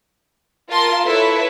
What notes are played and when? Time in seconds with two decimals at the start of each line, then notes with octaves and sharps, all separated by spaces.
0.69 F4 A#4 A5 C6
1.04 E4 A4 B4 C#5 E5